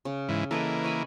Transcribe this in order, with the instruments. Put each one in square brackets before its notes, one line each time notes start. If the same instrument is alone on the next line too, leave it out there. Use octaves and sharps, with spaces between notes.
[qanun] C#3
[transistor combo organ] G#2 E3
[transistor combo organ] E3 A#3 [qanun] A4 B4 D#5
[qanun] C#5 G#5 B5